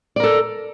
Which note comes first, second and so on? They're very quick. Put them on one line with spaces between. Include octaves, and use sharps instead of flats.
D5 A#4 A4